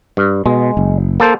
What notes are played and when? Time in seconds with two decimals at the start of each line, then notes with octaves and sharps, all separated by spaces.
0.17 G2
0.46 B2 G#3
0.77 F#1
1.20 A#3 A4 C5